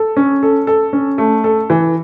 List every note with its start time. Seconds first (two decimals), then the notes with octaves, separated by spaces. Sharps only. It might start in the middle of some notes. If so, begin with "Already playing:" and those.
Already playing: A4
0.17 C#4
0.43 A4
0.67 A4
0.93 C#4
1.18 A3
1.44 A4
1.70 E3